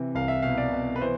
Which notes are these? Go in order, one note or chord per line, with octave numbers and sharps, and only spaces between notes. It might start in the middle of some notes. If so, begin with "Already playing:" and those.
Already playing: C3 E3
C2 F5
E5
B2 F5
D5
B2
B4
E3 C5